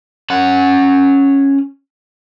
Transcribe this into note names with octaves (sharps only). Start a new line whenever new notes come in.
C#4 F#5